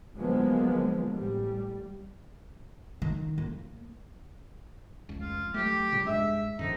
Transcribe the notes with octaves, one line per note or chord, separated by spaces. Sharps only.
D3 F3 F#3 G#3 A#3 B3
A1 G3
D#3
A#3
F1 C#2
F4
F#3 A3 G4
A#2 C#3 G3
G2 G#3 E5
F#2 D3 F3 D#4